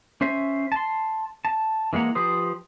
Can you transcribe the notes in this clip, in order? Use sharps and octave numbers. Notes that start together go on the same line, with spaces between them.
C#4 C5 E5
A5 C6
A5
E3 G#3 A#3 F#5 A#5
F3 G4 B4 C5 D#6